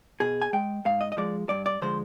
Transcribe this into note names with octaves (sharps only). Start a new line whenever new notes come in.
B2 G#4
G#5
G#3 G5
G#2 F5
D#5
D#5
F3 G#3 D5
G2 D5
D5
D3 F3 G#3 C5